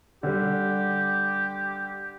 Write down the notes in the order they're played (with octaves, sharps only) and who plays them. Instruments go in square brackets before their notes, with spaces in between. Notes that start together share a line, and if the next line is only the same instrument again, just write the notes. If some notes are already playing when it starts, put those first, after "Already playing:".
[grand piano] D3 G3 [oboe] G4